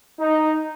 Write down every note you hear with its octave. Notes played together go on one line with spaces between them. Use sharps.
D#4